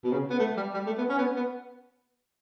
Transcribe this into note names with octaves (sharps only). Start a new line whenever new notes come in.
B2
C#3
B3
A3
G3
G3
A3
B3
C#4
B3
B3